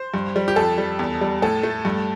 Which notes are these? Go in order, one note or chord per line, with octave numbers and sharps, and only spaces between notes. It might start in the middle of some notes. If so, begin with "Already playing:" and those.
Already playing: C5
G2
G3
G4
F2 A4
G3
E2
G3
A2 A4
A3
G2